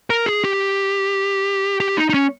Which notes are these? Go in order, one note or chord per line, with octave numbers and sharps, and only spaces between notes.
A#4
G#4
G4
G4
D#4
D#4
C#4